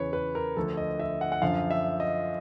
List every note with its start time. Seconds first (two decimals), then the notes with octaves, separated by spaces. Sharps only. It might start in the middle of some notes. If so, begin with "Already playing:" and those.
Already playing: E2 C#3 E3 B4 C#5
0.13 B4
0.35 A#4
0.57 D2 D3 F3 A4
0.77 D#5
1.00 E5
1.21 F#5
1.32 F#5
1.42 F#2 D3 F3 F5
1.71 E5
2.00 D#5